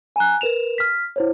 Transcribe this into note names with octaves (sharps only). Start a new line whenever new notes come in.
G#5 A#5 F#6
A#4 B4 E7 F7
F6 B6
E4 C5 C#5